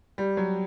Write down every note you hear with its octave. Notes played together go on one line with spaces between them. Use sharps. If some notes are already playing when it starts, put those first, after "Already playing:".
G3
F#3